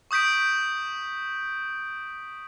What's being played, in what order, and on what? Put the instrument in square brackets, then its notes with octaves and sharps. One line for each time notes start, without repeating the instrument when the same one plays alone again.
[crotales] C#6 D#6 G6 B6 D7